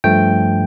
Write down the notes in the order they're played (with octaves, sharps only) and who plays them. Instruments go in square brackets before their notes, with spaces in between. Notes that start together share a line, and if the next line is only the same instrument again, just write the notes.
[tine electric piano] G2 F3 A3 G5